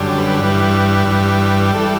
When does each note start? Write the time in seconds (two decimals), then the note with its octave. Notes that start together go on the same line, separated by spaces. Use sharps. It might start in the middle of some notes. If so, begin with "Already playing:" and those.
Already playing: F#2 D3 G3
0.18 B4
0.40 G2 E3 G3
1.07 G2 E3 G3
1.74 E3 G3 A4